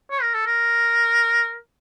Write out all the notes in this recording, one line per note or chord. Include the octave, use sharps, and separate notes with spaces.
C#5
A#4
A4
A#4